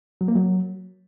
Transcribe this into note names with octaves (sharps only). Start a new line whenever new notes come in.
F#3
A#3
F#3